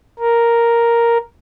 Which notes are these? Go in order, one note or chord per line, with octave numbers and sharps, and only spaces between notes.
A#4